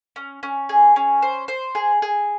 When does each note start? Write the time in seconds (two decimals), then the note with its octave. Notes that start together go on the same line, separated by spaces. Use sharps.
0.16 C#4
0.43 C#4
0.69 G#4
0.96 C#4
1.22 C5
1.48 C5
1.75 G#4
2.02 G#4